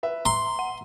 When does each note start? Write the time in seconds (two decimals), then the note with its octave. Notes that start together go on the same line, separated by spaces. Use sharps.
0.03 B4 E5
0.25 A#5 C6
0.59 F#5